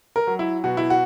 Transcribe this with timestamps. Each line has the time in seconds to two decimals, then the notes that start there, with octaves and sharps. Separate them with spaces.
0.16 A#4
0.27 F#3
0.39 E4
0.64 B2 F#4
0.77 E4
0.90 F#4